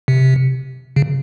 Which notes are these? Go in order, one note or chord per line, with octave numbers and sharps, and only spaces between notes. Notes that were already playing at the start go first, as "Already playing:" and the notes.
C3
C#3